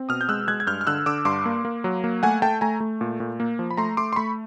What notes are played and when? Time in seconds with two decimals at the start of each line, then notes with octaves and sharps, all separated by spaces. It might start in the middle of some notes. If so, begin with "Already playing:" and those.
Already playing: C4
0.09 B2 D#6 F6
0.21 G6
0.29 G#3 E6 F#6
0.48 G#3 F#6 G#6
0.60 G#6
0.67 G2 F6 G6
0.81 F6
0.87 D3 E6 F#6
1.06 D3 D6 E6
1.25 G2 C6 D6
1.45 A#3
1.65 A#3
1.84 F#3
2.04 A#3
2.23 A3 F#5 G#5
2.42 A3 G5 A5
2.61 A3 G#5 A#5
2.80 A3
3.01 A#2
3.20 A#2
3.40 A#3
3.59 F3
3.71 B5
3.77 A3 A#5 C6
3.97 A3 C6 D6
4.13 C6
4.16 A3 B5 C#6